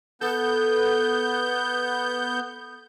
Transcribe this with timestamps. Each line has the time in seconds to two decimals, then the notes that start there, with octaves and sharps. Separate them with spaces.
0.21 B3 A4 G6